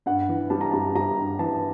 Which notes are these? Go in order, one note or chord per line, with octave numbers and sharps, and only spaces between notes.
G2 F#5
E3
G3 A5
A#5
G3 A5
G3 A#5
G2
E3 A5